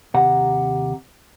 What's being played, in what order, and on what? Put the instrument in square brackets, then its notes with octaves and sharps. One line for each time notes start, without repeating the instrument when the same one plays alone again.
[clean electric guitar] D#2 C3 G4 F#5 A#5